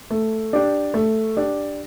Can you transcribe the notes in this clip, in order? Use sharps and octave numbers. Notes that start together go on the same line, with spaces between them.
A3
D4 G4 D5
A3
D4 G4 D5